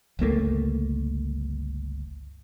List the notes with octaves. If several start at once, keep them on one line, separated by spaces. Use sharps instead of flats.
G1 C#2 A3 A#3